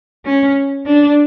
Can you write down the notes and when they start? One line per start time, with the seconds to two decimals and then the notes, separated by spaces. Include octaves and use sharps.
0.25 C#4
0.86 D4